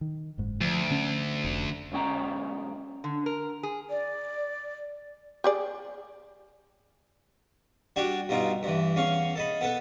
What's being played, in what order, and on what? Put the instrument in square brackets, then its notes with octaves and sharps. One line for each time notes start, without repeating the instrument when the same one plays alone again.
[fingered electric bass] D#3
F#1 G#2
[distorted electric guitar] D2 [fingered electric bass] F3
[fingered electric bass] D3 C#4
F1
[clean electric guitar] B1 G#2 C#4 G5 A#5
[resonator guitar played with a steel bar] D3
A#4
G#4
[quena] D5
[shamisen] G4 G#4 D5
[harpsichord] G3 D4 F#4 G4
G2 B2 D#4 F4
G2 E3
E2 C#4 F5 C#6
A4 D#5 B5
B3 A4 B4